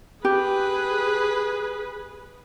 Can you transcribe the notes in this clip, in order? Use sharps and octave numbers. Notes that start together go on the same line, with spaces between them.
G4 G#4 B4